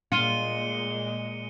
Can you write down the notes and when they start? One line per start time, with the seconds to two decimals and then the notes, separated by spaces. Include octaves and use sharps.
0.12 A#2 G#3 F4 C#7 D#7 G7